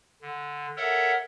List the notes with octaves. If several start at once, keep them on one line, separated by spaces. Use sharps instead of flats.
D3
A4 A#4 C#5 E5 F#5